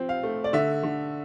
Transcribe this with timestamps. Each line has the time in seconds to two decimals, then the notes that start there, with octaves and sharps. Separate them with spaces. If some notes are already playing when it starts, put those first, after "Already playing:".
Already playing: F3 C4
0.09 F5
0.23 A3
0.44 D5
0.53 D3 E5
0.83 D3